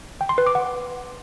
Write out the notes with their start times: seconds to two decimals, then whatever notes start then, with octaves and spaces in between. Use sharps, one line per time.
0.21 G5
0.29 C6
0.38 B4
0.46 D6
0.55 F#5